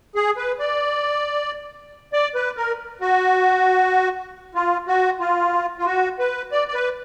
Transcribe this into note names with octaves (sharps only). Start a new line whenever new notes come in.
G#4
B4
D5
D5
B4
A#4
F#4
F4
F#4
F4
F4
F#4
B4
D5
D5
B4